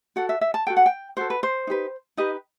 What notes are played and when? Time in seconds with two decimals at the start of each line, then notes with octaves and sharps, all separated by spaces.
0.16 F#4 A4 F#5
0.29 E5
0.41 E5
0.54 A5
0.67 F#4 A4 G5
0.77 F#5
0.86 G5
1.17 F#4 A4 C5
1.30 B4
1.43 C5
1.67 D#4 G4 B4
2.17 D#4 G4 B4 D#5